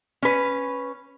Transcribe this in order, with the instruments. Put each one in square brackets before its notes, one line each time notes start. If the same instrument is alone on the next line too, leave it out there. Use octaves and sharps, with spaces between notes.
[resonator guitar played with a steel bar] C#4 B4